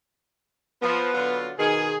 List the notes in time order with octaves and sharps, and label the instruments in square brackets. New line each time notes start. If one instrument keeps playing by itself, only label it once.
[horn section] F3 [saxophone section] B3
[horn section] D3 F#3 F4
[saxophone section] B2 D#3 [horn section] G#4